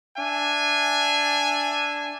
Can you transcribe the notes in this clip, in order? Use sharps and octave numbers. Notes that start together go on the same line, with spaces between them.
D4 E5 G#5